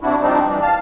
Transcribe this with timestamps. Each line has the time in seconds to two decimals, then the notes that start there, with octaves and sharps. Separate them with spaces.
0.01 C3 D4 E4 F#4
0.21 F3 G3 C4 D4 D#4
0.46 E3 G3 D4
0.62 F5 A5